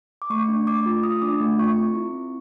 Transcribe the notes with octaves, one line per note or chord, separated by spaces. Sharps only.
D6
A3 C#6
D4
A3 D6
F4
A3 D#6
D4 D6
A3
F4 C#6
C4
E4
C4